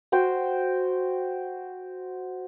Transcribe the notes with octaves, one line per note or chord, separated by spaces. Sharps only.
F#4 C5 G5